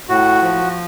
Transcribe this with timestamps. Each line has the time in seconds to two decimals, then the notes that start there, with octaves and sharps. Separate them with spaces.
0.08 A2 F#4
0.42 F3